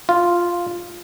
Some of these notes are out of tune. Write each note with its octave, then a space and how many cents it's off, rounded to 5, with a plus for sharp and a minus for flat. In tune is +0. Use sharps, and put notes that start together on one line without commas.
F4 -5